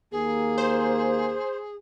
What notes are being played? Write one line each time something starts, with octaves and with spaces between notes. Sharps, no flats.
D#2 A#3 G#4
C5